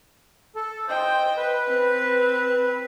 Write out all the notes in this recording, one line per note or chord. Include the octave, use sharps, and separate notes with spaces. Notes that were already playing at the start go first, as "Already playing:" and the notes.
A4
C5 D#5 G5
B4
C4